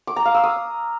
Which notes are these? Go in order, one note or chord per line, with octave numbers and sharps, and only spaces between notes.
D6
A#5
F5
E6
D#6